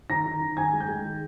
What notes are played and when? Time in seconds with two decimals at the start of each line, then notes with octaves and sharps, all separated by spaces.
0.09 D#3 A#5 A#6
0.26 D#3
0.41 D#3
0.57 D#3 G#5 G#6
0.73 G#3
0.80 G5 G6
0.88 G#3
1.04 D#3